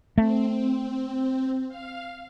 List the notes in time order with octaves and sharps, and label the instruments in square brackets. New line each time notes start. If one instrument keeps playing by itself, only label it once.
[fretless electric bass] A3 [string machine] C4
[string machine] F5